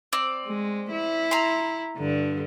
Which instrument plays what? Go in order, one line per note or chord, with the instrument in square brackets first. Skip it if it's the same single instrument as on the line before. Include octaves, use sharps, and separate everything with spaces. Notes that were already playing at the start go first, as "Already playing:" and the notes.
[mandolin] C4 D5
[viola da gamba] G#3
E4
[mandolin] A#5 C6
[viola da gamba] G2 D3